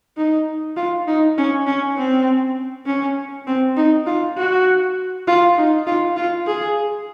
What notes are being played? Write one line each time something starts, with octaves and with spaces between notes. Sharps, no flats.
D#4
F4
D#4
C#4
C#4
C4
C#4
C4
D#4
F4
F#4
F4
D#4
F4
F4
G#4